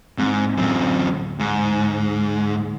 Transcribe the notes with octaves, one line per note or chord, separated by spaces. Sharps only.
G#2 E3 C4
D1 F#2 C4
G#2